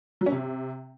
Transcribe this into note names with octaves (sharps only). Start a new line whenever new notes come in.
F#3
C#4
C3